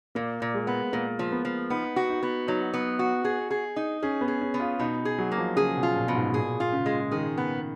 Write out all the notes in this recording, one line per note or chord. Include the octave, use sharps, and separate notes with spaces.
A#2 A#3
A#2
G#3
B3
A#2 A#3
F3
B3
F3
B3 D#4
F#4
D#4
B3
F#3 D#4
B3
F#4
G#4
G#4
D#4
C#4 G#4
B3
G#4
C#4
B3
F4
B2 D#4
G#4
F#3
A#3
F3
C#3 G#4
B2
F4
A#2
B2
G#2
A#2 G#4
F4
C#3
G#3
D#3 G#4
B3